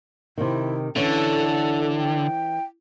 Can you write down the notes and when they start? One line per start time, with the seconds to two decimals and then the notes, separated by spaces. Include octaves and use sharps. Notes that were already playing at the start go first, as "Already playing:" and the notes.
0.38 C3 D#3 E4
0.96 D3 E3 C#4 A4
1.97 G5